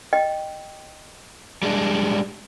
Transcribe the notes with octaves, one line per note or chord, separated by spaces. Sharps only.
D#5 G5
G3 G#3 D4